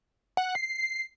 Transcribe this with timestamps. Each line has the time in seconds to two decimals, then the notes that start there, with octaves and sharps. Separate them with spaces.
0.37 F#5
0.55 C7